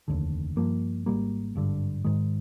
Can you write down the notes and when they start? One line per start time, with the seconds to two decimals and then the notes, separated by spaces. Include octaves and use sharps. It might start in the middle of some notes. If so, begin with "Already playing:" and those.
0.08 F1 D#2 D3
0.57 G2 F3 A#3
1.06 G#1 G#2 G3 A#3
1.55 G#1 G2 D3
2.04 G#2 D#3 G#3